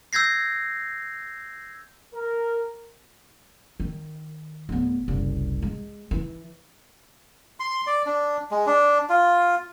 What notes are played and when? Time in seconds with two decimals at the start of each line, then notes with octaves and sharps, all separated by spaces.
0.13 E6 G6 G#6 A#6 C7
2.14 A#4
3.80 D#3
4.69 D1 B3
5.08 F#1 C2
5.62 G#3
6.11 E3
7.60 C6
7.87 D5
8.06 D4
8.51 G#3
8.67 D4
9.09 F4